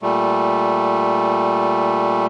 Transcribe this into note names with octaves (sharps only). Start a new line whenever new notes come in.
A#2 G3 A3